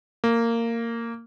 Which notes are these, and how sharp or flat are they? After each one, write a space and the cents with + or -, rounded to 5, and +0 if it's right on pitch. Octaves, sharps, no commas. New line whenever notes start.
A#3 -15